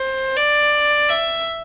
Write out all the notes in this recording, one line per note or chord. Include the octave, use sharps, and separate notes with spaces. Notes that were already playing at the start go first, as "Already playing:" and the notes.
Already playing: C5
D5
E5